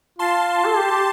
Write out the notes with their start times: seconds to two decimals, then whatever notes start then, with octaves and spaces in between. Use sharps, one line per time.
0.19 F4 A5 C6
0.66 A4
0.77 G4
0.91 G4